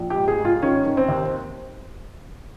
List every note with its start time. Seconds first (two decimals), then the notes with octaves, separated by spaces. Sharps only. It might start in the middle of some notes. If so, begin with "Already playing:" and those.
Already playing: A#1
0.10 G4
0.16 G#2
0.28 G#4
0.39 G#2
0.45 F4
0.62 D#3 C#4
0.86 D#3
0.97 C4
1.08 D#2